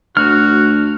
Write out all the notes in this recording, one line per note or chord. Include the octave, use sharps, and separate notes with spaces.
D2 F#4 F6